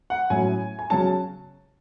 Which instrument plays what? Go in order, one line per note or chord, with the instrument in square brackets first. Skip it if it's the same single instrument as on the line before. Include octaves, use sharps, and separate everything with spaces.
[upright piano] F#5
A2 F#3 C#4 E4 G#5
G#5
C#3 F#3 C#4 A5